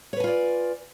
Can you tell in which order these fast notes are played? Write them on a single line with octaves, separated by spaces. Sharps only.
C#5 B4 G#5 F4 D5